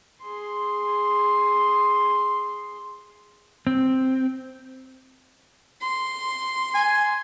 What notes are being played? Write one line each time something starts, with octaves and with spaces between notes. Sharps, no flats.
G#4 C6
C4
C6
G#5